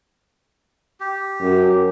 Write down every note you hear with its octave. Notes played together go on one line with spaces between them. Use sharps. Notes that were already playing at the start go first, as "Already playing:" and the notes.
G4
F#2